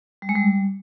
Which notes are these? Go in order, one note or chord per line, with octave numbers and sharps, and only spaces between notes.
G3
G#3
G3